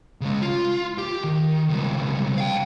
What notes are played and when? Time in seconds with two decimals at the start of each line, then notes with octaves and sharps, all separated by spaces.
0.21 C#3 G#3
0.42 F4
0.98 G4
1.24 D#3
1.69 C#2 G3
2.38 F5 G5